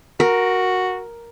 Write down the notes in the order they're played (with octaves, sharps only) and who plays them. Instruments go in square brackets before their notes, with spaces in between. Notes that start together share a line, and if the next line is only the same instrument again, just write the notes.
[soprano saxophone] F#4 [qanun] A#4